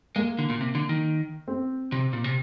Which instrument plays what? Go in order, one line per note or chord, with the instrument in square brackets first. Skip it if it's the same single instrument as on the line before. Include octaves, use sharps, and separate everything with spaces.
[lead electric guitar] G#3 [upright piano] A#3
[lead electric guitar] D3
A#2
C3
D3
D#3
[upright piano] C4
[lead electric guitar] C3
A#2
C3